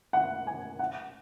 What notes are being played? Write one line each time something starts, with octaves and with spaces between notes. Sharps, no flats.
F#5
G#5
F#5